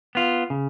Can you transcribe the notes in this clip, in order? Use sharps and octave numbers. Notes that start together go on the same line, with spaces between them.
B3 F4
C#3